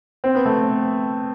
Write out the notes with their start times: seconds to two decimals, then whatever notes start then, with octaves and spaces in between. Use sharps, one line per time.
0.24 C4
0.35 B3
0.45 A3